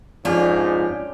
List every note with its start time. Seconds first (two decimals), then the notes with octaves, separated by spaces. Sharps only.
0.25 F2 G#2 C#4 D4 F4 G4 D5